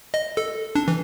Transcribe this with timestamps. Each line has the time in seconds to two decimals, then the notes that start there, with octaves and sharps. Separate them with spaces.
0.14 D#5
0.37 A4
0.75 D4
0.88 E3